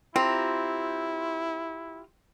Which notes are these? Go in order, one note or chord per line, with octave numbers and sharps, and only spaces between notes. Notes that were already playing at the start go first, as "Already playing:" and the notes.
C4 E4 F4 G4 A#5